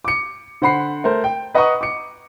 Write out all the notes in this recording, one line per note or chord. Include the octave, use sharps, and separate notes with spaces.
D6 C#7
D3 C5 F#5 B5 C7
A3 A#4 C5
G5
B4 D#5 F#5 A#5 C#6 D#6
D6 C#7